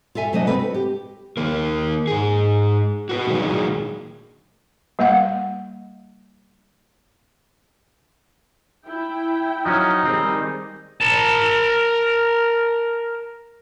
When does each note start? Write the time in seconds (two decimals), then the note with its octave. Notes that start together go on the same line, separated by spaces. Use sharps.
0.15 F4 A4 E5 G#5
0.33 C3 F#3 A3 D4 D#5
0.47 C4 A4 B4
0.59 F#4
0.74 G4
1.37 D#3 A#3 A#4
2.07 G#2 G#4
3.09 F#4 A#4 B4
3.27 A#2 D3 D#3 F#3 G#3
4.99 G3 A#3 F5 F#5
8.86 E4 G5
9.65 F3 F#3 C#4 D#4
10.05 D#3 G3 C4 G#4
11.01 A#4 A5